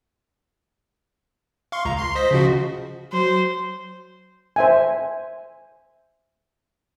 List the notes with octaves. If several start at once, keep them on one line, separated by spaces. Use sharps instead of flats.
F5 C6 C#6
C#2 A#5
C6 C7
C5 D#5 B6
C#3 F3 F#4
F#3 C5
C5 E5 G#5